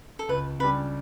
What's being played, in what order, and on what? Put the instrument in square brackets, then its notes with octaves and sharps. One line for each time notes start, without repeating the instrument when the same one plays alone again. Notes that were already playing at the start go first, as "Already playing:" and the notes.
[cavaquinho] A4
[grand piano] C#2 [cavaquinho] B4
[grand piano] C#3 G3 D4 G4 [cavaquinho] B4